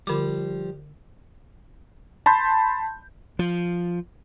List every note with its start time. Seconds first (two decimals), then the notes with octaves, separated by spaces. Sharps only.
0.07 D3 F3 G3 D6
2.26 A5 B5 C6 G6
3.39 F3